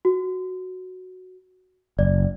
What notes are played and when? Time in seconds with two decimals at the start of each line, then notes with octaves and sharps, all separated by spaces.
0.05 F#4
1.99 F#1 D5